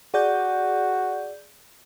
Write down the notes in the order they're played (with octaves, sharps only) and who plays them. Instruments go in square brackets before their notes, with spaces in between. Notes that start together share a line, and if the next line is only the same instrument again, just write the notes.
[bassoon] F#4 [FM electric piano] G#4 D5 G6